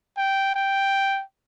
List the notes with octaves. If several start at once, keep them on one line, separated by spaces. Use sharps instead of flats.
G5
G5